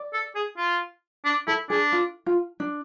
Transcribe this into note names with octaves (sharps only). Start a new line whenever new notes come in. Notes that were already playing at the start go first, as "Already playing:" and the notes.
Already playing: D5
A4
G#4
F4
D4
E4 A4
D4 G#4
F4
F4
D4